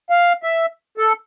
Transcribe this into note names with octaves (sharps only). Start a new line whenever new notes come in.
F5
E5
A4